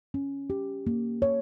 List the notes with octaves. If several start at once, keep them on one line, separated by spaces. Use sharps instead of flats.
C#4
G4
A#3
C#5